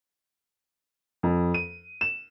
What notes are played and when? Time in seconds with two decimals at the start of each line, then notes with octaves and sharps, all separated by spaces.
1.23 F2
1.54 D#7
2.01 E7